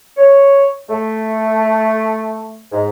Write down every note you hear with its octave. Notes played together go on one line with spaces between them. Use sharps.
C#5
A3
G#2